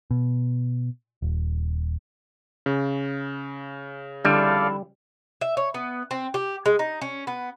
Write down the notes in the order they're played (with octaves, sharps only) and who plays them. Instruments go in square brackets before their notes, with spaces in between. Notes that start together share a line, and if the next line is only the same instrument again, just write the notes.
[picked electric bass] B2
D#1
[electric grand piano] C#3
[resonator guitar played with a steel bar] F2 D3 E4 [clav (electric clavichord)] G3 [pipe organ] A4 D5 F5
[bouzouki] E5
C#5
B3
C4
G4
G#3
D#4
C#4
B3